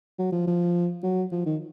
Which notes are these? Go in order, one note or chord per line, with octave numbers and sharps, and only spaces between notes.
F#3
F3
F3
F#3
F3
D#3